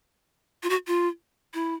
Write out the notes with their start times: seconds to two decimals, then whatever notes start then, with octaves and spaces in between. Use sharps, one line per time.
0.63 F4
0.70 F#4
0.87 F4
1.54 E4